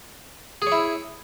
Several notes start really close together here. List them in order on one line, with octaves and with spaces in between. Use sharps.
G#4 C#5 E4